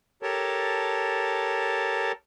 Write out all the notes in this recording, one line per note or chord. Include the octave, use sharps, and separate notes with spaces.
G4 A4 A#4 C#5 A5